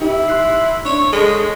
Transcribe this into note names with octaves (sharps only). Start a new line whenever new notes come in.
D#4 E4 G4
C6 F#6 C7
D4 C#5
G#3 G#4 A4